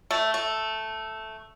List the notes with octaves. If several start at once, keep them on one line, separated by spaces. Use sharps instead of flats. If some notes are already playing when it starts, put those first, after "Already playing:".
A3
A3